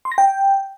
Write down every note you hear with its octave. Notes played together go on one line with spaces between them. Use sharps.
C6
A#6
G5